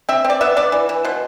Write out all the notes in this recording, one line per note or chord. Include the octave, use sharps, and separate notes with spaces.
C4 E5
C4
D5
B3 E5
B3 D5
E3
E3
B2 C5